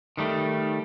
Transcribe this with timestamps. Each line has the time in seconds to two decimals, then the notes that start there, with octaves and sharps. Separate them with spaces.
0.17 D#3 G3 A3